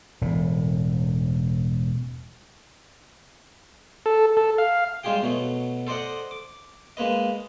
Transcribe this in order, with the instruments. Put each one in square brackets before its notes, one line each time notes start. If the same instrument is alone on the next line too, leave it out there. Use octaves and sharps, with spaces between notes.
[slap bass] E1 A2
[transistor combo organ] A4
A4
F5
[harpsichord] G3 G#3 F4 G4 G#4 G5
B2 F#3 A3
A4 C5 D5 D#5 F#5
D6
G#3 A#3 B4 D#5